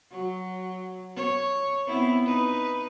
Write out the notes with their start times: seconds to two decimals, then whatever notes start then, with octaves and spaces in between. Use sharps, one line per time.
0.12 F#3
1.16 C#5
1.87 B3 C4 E4
2.26 D#4 B4